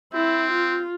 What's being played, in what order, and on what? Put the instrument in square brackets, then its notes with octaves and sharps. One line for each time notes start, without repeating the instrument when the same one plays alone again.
[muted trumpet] C4 [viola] E4
[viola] F4